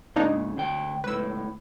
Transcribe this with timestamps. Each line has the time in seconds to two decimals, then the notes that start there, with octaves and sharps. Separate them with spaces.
0.16 G#2 C#3 A#3 D4 D#4
0.57 D2 G5
1.04 C#2 A2 B4 E6